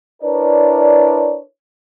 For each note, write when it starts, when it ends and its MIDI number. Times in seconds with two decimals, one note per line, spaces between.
0.23 1.40 62
0.23 1.40 64
0.23 1.40 70
0.23 1.40 71
0.23 1.40 73
0.23 1.40 74